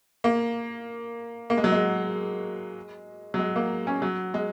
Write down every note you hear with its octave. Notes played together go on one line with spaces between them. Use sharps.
A#3
A#3
G#3
F#3
G#3
F#3
G#3
A#3
C#4
F#3
G#3